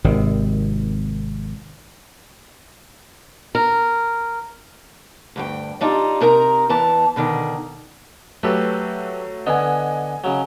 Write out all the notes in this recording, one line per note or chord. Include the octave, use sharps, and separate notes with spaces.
G#1 C3 D#3
A#4
D2 G2 G5
G3 D4 D#4 F4
C3 D#4 A#4 A#5
E2 E3 A5
B2 D3 D#3
F#3 A3 G4 A4 B4
D3 B3 D#5 G#5
C#3 F#3